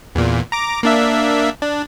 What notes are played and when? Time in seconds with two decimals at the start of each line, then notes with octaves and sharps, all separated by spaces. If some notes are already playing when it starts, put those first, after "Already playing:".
0.15 E2 A#2
0.52 A#5 D6
0.83 A#3 D4 E5
1.62 D4